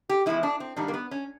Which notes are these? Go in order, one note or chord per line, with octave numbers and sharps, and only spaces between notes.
G4
E2 C#3 F3 G#3 E4
D4
C4
G#2 D#3 G3 A#3 D4
A#3
B3
C#4